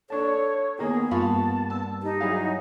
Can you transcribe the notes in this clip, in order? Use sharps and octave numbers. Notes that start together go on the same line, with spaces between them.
D4 A4 C#5 A5
D#3 A#3 B3 G#4
G2 A#3 F4 F5 A5 B5 C#6
A5 E6
D#4 G4
F#3 E4 G#4 F5